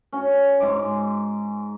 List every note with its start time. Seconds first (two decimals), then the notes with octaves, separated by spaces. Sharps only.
0.13 C#4 F#4
0.60 G#2 G#3 D6